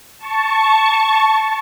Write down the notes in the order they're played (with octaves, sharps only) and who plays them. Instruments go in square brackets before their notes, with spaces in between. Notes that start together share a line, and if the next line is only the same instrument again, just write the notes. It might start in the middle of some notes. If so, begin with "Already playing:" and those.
[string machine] A5 C#6